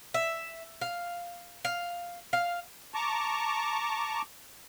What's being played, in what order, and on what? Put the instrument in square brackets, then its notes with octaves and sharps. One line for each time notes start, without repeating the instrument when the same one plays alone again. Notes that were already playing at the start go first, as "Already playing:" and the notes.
[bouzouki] E5
F5
F5
F5
[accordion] A5 A#5 C#6 D6